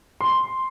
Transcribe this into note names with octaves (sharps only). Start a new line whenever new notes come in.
C6